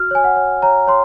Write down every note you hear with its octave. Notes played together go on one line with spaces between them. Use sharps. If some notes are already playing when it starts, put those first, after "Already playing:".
Already playing: F#4 F6
C#5 G#5
F#5
C#5
C#5 A#5
C#5 C6